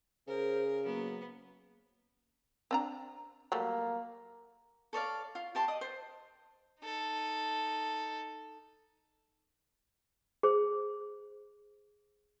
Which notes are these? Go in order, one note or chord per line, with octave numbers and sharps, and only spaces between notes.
C#3 G#4 A#4 C5
F#3 A#3 B3
C4 D4 A#5
F#3 G3 A3 A#3
A4 C#5 D5 F5
F4
G4 A5 C6
D5 D#5 D#6
C5
D#4 A4
G#4 C5